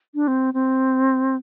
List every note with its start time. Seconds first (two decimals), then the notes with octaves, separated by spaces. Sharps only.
0.15 D4
0.27 C4
0.54 C4